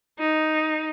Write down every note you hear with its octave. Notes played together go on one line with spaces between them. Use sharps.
D#4